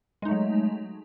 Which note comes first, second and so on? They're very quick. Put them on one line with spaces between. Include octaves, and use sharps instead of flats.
G#3 D#4 A3 F#3